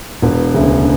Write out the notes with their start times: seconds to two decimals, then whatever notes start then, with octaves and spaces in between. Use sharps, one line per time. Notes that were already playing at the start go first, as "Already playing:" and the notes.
0.22 E1 B3
0.54 D2 C#3